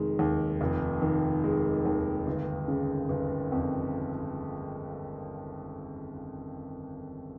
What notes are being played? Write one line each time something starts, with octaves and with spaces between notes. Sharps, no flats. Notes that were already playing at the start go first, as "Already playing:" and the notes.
Already playing: F1 D#3 G#3
D#2
F1
D#3
G#3
D#2
G1
C#3
G1
F2